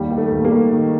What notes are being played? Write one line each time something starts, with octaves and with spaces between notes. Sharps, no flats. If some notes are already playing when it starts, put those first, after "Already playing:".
Already playing: D#2 G3
D#3
A3
D#2
G3 A#3
D#3
D#3